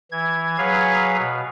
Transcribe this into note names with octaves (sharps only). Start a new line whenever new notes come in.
E3 G#6
F#3 G#4 B4 C#5 F5
B2